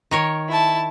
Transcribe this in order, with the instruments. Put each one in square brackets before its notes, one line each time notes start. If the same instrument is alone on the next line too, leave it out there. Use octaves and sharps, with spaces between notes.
[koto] D#3 A#4 C#5
[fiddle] E4 A5